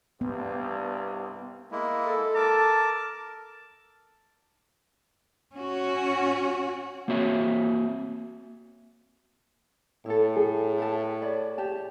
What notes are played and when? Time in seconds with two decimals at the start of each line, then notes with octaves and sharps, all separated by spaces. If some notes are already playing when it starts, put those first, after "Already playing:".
0.21 C2 G2 B3
1.71 G#3 A#3 E4
2.07 A4
2.36 A#4 A5 D6
5.55 C#4 F#4
7.08 A#3 C4 F#4 C#5 E5
10.06 A2 E4 A4
10.37 G#4
10.78 B4 E5 A5
11.22 C#5 D5 B5
11.58 G4 A5